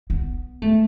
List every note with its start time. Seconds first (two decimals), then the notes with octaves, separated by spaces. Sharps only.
0.10 B3
0.62 A3